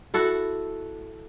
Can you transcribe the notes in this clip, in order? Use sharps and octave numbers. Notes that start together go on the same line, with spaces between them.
E4 F#4 A4